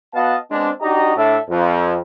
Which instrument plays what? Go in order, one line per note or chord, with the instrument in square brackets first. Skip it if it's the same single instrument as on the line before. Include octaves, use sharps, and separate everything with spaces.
[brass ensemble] B3 F#4 D#5 F5 F#5 A5
G#3 B3 C4 D4
D4 D#4 F#4 G4 D#5 A#5
A2 D4 A4 E5
F2